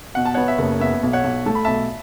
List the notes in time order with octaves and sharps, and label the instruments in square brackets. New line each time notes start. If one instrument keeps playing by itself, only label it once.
[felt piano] B2 [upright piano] F#5
[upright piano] A5
[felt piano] B3 [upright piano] C#5 F#5
[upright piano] E5
[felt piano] F#1
[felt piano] B3 [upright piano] E5
[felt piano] B1
[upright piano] C#5 F#5
[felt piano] B1
[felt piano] A3 [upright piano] A5
[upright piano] B5
[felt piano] B1 [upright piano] E5 A5